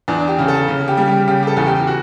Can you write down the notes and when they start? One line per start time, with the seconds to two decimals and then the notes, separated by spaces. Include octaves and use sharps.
0.08 E2 D4
0.28 G4
0.38 C#3
0.48 A4
0.68 C#3
0.88 G4
0.97 G3
1.08 G4
1.27 C#3 G4
1.43 G4
1.47 A4
1.57 E2
1.67 G4
1.87 F#4